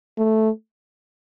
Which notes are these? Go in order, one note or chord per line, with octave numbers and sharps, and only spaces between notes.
A3